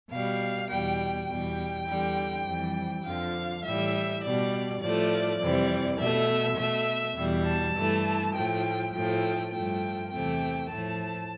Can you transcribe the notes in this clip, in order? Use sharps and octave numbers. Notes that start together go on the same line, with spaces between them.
B2 G3 F5
E2 B2 G3 G5
E2 B2 G3 G5
E2 D3 G3
F2 E3 G3
F2 D3 F3 F5
A2 E3 G3 E5
B2 G3 D5
A2 F3 A3 D5
F2 C3 E3 G3
B2 A3 E5
B2 A3 E5
E2 B2 G3
A5
G2 E3 A3
A2 F3 A3 G5
A2 F3 A3 G5
G2 F3 A3 G5
E2 C3 E3 A3 G5
A2 F3 A3 A5